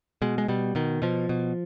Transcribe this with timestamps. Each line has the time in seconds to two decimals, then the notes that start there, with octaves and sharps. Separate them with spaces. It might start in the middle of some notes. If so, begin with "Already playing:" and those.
0.22 B2 G#3
0.38 G#3
0.48 B2 G3
0.75 B2 D#3
1.02 B2 F3
1.29 B2